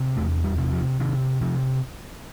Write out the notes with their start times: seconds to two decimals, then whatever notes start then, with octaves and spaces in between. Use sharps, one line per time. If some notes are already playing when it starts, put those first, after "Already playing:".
Already playing: C3
0.17 E2 A3
0.44 G3
0.58 C3
0.72 F3
1.00 C3 D#3
1.41 C3 F3